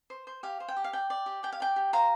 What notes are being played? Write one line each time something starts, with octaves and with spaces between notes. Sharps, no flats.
C5
C5
G4 F5
C5
G5
G4
F5
D5 G5
D5
G4
G4 G5
F5
D5 G5
G4
C5 F5 A#5